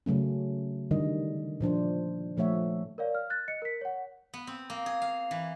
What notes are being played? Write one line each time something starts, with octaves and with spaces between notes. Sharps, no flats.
C#3 F#3 A3 C#4
D3 D#3 G3 D4 D#5
A#2 F3 D4 C5
A#2 F3 A3 C#5 E5 F#5
A#4 C#5 D5 F5
F6
F#6 A6
D#5 C#7
A#4 B6
C#5 F#5
B3
C4
A#3
G#4
F5
E3